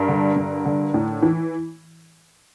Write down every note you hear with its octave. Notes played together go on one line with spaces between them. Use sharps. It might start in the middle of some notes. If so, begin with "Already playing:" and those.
Already playing: G2 A#4
D3
G2
D3
A2
E3